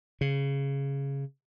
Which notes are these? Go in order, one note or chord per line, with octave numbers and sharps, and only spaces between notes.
C#3